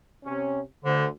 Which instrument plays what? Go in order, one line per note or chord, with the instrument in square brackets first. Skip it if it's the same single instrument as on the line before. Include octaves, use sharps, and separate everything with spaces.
[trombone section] C3 C#4
[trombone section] D2 C5 [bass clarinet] D3